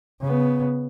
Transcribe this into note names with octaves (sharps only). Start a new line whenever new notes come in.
C#3 B3